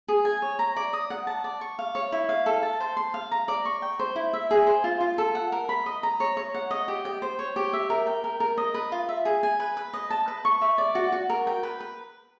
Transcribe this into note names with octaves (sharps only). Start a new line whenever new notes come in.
G#4
G#5
C#5
A#5
D5
D#6
F#5
A5
D5
C#6
F5
C#5
E4
F5
A4
A5
C5
C6
F5
A#5
D5
C#6
G5
C5
E4
E5
G#4
C5
F4
F4
A4
F#5
A#4
B5
D#5
A#5
C#5
C#5
F#5
D#5
G4
G5
C5
C#5
G4
E5
A#4
G5
A#4
A#4
D#5
B4
F4
E5
G#4
G#5
B4
B4
D#5
A5
B4
C#6
E5
D5
F#4
F#4
A#4
G5
B4
B4